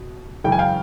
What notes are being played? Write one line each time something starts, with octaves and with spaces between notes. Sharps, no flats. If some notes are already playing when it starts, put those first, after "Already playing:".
Already playing: B2
F#2 C#3 E3 G#3 G5
G#5
F5 G5